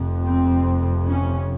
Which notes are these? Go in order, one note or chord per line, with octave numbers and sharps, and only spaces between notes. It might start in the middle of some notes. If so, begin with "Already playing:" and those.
Already playing: F1 F2 C3
C4
C#4